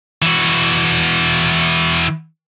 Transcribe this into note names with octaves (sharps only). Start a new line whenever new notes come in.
E3 F#4